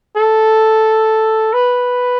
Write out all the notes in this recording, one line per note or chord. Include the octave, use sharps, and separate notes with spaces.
A4
B4